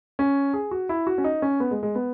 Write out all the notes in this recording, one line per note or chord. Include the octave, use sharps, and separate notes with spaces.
C#4
G#4
F#4
E4
F#4
C#4
D#4
C#4
B3
G#3
G#3
B3